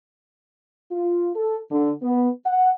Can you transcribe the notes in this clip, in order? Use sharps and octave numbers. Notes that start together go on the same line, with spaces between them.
F4
A4
D3
B3
F#5